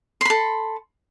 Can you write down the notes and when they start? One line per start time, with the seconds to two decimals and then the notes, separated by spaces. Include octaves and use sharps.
0.21 C6
0.25 B5
0.30 A4